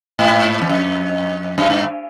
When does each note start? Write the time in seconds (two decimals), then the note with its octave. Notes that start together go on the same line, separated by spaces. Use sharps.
0.19 G#2
0.62 E2
0.69 F2
1.58 F#2
1.70 G2